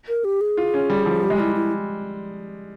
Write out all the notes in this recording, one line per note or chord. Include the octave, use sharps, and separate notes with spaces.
A#4
G4
G#4
F4
C#4
G3
F3
G3 G4
G#3
G3 E4
E4